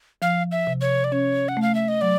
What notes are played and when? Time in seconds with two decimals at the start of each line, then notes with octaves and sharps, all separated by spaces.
0.22 F3 F5
0.52 E5
0.67 C3
0.81 C#5
1.04 D5
1.12 C#4 C#5
1.49 F#5
1.57 A3
1.62 F5
1.75 E5
1.88 D#5
2.01 F#3 D5